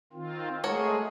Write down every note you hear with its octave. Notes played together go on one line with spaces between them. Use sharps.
D#3 C4 F4
G#3 A3 F#4 G#4 A#4 C#5